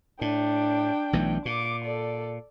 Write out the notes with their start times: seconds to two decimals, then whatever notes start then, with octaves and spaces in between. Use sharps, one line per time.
0.21 A2 D4 G5
1.13 B1 E3 A3
1.45 A#2 D6
1.85 A4 D5